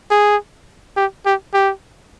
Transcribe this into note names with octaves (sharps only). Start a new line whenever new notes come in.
G#4
G4
G4
G4